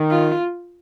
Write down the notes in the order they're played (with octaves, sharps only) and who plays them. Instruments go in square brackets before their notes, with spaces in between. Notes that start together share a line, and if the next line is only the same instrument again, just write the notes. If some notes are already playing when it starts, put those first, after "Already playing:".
Already playing: [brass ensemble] D#3
[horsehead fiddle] F4